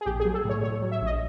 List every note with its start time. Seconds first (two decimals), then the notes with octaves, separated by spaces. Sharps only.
0.01 G#4
0.06 A#1 G4
0.20 G#4
0.25 F#3
0.34 A4
0.45 A2 C#5
0.63 A2 C#5
0.82 F#3
0.92 E5
1.01 A#1
1.06 D#5